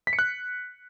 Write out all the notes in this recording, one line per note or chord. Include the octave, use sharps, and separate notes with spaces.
B6
C#7
F#6